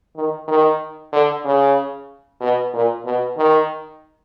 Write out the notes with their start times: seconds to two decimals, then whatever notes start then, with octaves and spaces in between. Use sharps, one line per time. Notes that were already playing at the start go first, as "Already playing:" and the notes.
0.16 D#3
0.48 D#3
1.12 D3
1.44 C#3
2.41 B2
2.73 A#2
3.05 B2
3.37 D#3